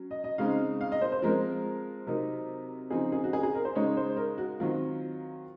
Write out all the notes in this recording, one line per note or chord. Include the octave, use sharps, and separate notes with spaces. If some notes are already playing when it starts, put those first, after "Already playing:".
Already playing: F#3 C#4
D#5
D#5
C#3 G#3 C4 D#4 F5
F5
D#5
C5
C5
F3 G#3 C4 A#4
C3 F#3 C4 D#4 A#4
C#3 F3 C4 D#4 G#4
G#4
F#4
G#4
G#4
A#4
C5
C#3 G#3 D#4 C#5
C5
A#4
F#4
D#3 F#3 C4 F4